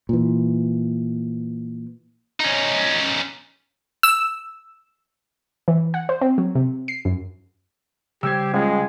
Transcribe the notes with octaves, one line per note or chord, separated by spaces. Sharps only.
A#2 E3
C#4 D#4
E6
E3
F#5
C5
C4
F#3
C3
C7
F#2
C#3 G3 G4 C5 E6 G#6
C#2 G#3